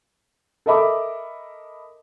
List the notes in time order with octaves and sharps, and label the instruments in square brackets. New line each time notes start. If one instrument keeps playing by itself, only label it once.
[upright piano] A4 A#4 D#5 E5 B5 D6